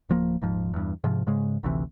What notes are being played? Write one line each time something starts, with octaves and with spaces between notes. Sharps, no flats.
D1 F3 A#3
D#1 G#2 F3
E2 G2
G#2 C3 F3
G#2 C#3 G#3
G#1 D2 C3 E3